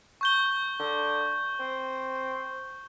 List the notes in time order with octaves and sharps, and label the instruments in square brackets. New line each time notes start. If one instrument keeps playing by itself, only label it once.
[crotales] C#6 G6 G7
[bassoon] D3
C4